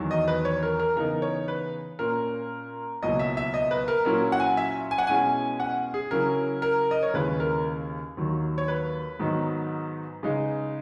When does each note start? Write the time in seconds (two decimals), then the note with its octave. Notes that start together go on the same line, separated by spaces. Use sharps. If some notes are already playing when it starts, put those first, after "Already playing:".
Already playing: E2 D#3 F#3
0.11 D#5
0.28 B4
0.45 C#5
0.63 A#4
0.80 A#4
0.96 C#3 E3 B3 D#4 A#4
1.22 C#5
1.48 B4
1.99 A#2 A#3 C#4 A#4
3.02 C#2 B2 F#3 A#3 E4 D#5
3.19 E5
3.37 E5
3.54 D#5
3.71 B4
3.88 A#4
4.05 A#2 F#3 C#4 E4 A#4
4.32 F#5
4.40 G#5
4.57 E5
4.91 G#5
4.98 F#5
5.07 B2 G#3 C#4 E4 G#5
5.60 F#5
5.94 G#4
6.11 C#3 F#3 C#4 E4 A#4
6.62 A#4
6.91 D#5
7.03 C#5
7.14 D#2 C#3 G#3 C#4 E4 B4
7.40 A#4
8.17 D#2 D#3 F#3
8.58 C#5
8.68 B4
9.20 G#2 D#3 F#3 B3 D#4
10.23 C#3 G#3 D#4